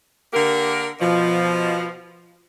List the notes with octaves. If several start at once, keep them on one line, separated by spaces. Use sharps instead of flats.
D3 A#3 G4 A#4
B2 F3